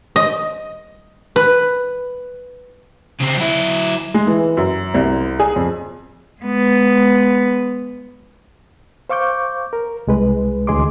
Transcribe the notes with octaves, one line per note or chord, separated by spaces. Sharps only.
D#5
B4
C#3 C4
F#3 E4
G#3
E3
F#2
C2
G#4
F2
G#3 B3
C5 F5 C#6 D6 G6
A#4
C2 G#3 B4
D2 E3 G#4 D#5 C6 D6